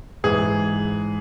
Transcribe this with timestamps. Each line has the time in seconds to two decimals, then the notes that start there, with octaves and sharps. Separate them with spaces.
0.24 G#2 E3 G#4